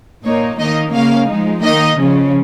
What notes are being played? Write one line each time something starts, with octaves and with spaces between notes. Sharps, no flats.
A#2 A#3 D#4 C#5
D#3 A#3 D#4 D#5
C#3 A#3 C#4 F5
F3 G#3 D#4
D#3 A#3 D#4 D#5
C#3 F3 C#4